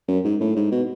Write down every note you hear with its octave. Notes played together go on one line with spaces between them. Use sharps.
F#2
G#2
A2
G#2
B2